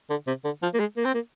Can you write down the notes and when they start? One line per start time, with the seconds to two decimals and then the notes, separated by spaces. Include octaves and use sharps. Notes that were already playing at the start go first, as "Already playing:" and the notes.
0.10 D3
0.27 C3
0.45 D3
0.62 F3
0.74 A#3
0.80 G#3
0.97 A#3
1.05 C4
1.14 A#3